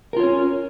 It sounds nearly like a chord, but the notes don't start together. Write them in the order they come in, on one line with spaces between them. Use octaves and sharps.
A#4 F4 C#5 C#4